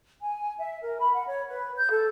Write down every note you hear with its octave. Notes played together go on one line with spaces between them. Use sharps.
G#5
E5
A#4
B5
F#5
C#5
B4
G6
A4